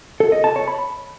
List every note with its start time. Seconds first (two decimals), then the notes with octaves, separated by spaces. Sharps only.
0.20 A4
0.32 D#5
0.44 A5
0.56 C#5
0.68 B5